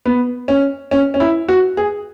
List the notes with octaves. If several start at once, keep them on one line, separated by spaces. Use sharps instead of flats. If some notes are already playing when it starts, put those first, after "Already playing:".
B3
C#4
C#4
C#4
E4
F#4
G#4